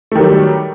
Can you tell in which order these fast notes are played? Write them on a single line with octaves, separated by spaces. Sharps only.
A3 D#3 F#3 G3